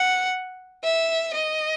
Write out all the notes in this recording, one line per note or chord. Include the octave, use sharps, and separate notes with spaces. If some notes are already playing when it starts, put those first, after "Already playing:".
Already playing: F#5
E5
D#5